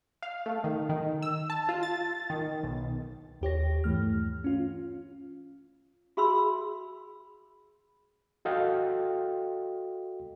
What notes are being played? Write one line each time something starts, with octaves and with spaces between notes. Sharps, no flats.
F5
A3
D#3
D#3
E6
A5
F4
A6
D#3
B1
D#2 G4 C#5 A#6
G2 E3 A3 F6
C#4 F4
F#4 G#4 E5 B5 C6 E6
F#4 A4 D#5 F5 G5